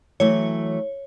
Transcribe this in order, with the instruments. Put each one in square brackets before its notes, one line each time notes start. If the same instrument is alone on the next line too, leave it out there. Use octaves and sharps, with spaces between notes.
[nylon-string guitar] E3 F#3 A3 [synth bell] C#5